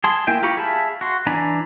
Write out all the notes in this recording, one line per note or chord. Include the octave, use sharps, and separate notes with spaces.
G#4 A5 C6
A#3 E4 G5 G#5
F4 G4 A#5 B5 C#6
G#4 E5 F5 A5 B5
F#4 C6
E3 D4 G#5 A#5 B5